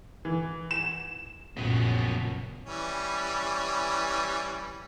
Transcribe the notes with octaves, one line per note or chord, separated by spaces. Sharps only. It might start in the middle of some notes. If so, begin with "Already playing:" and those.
E3
E7
A#1 F#2 A#2 C#3 B3
E3 G3 C#4